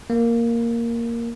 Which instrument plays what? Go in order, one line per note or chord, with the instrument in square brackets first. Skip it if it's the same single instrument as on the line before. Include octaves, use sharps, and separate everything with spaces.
[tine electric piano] A#3